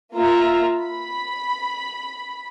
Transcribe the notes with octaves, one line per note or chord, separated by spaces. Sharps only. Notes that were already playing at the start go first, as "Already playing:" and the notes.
A#3 F4 E5 A#5
B5